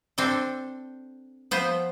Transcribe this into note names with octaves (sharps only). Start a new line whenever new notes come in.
C4 D4 A4
F3 B3 C5